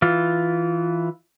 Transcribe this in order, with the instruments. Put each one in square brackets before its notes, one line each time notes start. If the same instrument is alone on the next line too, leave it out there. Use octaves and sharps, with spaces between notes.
[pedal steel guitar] E3 F4